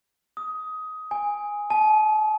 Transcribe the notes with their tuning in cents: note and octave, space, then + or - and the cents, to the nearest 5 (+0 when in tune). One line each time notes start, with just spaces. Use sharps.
D#6 +15
G#5 -10
A5 -40